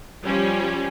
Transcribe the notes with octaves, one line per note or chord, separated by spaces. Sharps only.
F3 G3 C#4